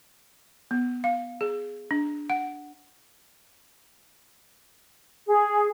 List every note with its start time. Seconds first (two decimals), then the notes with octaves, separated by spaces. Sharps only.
0.71 B3
1.04 F5
1.41 G#4
1.91 D4
2.30 F#5
5.26 G#4